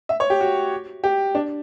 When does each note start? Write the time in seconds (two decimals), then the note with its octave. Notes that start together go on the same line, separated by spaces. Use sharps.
0.09 E5
0.20 C#5
0.30 G4
0.41 F#4
1.04 G4
1.35 D4